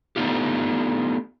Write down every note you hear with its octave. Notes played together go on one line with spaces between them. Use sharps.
A3 B3 D4 D#4 F4 G4